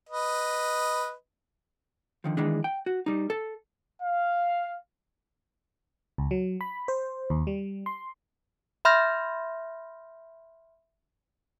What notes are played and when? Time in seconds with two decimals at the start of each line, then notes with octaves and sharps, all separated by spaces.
0.09 B4 D#5
2.24 D3 D#3 F3
2.37 D#3 E3 G#3 D4
2.64 G5
2.86 F#4
3.06 G3 D#4
3.30 A4
4.03 F5
6.18 C#2
6.31 F#3
6.61 B5
6.88 C5
7.30 D#2
7.47 G3
7.86 C6
8.85 E5 B5 C6 F6 G6 A#6